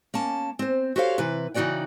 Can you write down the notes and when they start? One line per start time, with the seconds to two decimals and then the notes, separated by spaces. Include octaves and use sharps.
0.14 A#3 C#4 A5
0.59 C4 C5
0.96 F#4 G4 A4 C5 C#5 F5
1.18 C3 E3 B4
1.54 C#3 E3 D#4 F#4 D5 G5